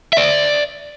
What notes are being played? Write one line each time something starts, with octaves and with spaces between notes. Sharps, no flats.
D5 E5